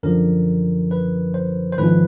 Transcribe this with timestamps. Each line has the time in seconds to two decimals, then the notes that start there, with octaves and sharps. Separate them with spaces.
0.03 F#2 D3 F3 A#4
0.91 B4
1.34 C5
1.72 C5
1.78 G#1 G#2 F3 B4